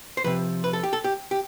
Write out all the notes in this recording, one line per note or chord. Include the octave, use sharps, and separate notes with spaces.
C5
C3 F3 B4
B4
A4
G4
A4
G4
G4